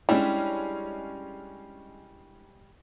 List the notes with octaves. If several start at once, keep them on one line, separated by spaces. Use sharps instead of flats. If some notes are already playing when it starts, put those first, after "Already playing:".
G3 G#3 C#4 D4 E4